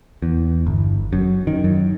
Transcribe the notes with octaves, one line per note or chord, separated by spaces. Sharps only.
E2
G1
F#2
D#3
F#2